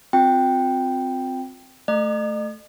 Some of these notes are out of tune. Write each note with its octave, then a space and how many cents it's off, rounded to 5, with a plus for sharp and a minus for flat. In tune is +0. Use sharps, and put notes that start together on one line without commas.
C4 -10 F4 +35 G5 +0
A3 +0 D#5 -45